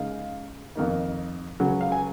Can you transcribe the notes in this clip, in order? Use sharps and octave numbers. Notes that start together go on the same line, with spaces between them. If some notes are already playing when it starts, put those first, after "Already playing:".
Already playing: C#3 G#3 D#4 F5
F2 D#3 A#3 D#4
C#2 C#3 F#3
F5
G#5